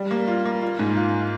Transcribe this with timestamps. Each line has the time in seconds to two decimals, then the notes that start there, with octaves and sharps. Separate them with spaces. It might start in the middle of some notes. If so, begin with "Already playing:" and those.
Already playing: G3
0.11 A#3
0.28 F4
0.45 A#3
0.62 F4
0.79 G#2
0.97 F4